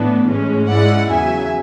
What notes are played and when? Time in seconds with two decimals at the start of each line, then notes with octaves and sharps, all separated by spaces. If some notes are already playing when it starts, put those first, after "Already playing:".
Already playing: A2 E3 B3 D4
0.30 A2 G#3 C#4
0.69 G#2 G#3 C#4 E4 D5 F#5
1.10 E2 C#3 F#3 E5 G#5